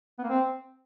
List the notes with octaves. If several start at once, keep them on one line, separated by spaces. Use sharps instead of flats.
B3
A#3
C4